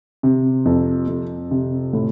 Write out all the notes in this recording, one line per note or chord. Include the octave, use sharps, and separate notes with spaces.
C3
F2
F2
C3
A2